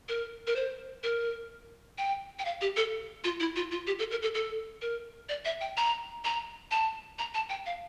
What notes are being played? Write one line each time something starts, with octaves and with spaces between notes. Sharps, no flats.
A#4
A#4
C5
A#4
G5
G5
F5
G4
A4
F4
E4
F4
F4
G4
A4
A#4
A4
A4
A#4
D5
E5
G5
A#5
A#5
A5
A#5
A5
G5
F5